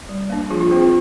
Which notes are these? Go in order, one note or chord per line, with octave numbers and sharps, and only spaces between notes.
G3
A#3 D4
F3 F4 G#4
F4 G#4
C4 G#4 C5
F4 G#4